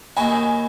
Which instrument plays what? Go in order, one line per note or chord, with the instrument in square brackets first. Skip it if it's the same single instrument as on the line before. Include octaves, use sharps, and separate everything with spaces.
[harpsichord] D#2 D#3 A#3 D#4 F#4 [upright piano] G#5 B5